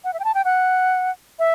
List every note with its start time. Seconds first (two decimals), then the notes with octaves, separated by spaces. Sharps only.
0.04 F#5
0.14 E5
0.20 G5
0.24 A5
0.35 G5
0.45 F#5
1.39 E5